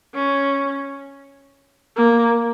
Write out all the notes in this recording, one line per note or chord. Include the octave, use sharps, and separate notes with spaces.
C#4
A#3